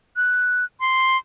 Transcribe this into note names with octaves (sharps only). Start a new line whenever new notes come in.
F#6
C6